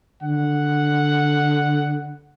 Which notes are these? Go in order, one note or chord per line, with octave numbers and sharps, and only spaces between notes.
D3 F#5